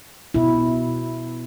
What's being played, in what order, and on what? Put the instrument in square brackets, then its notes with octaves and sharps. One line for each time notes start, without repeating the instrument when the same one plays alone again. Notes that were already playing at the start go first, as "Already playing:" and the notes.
[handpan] B2 E4